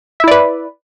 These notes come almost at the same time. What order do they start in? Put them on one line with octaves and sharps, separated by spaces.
E5 E4 D5 B4